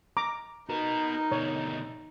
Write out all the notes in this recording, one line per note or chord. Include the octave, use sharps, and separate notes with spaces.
A#5 D6
D#4 F#4 A#4 B4
B2 D3 C#5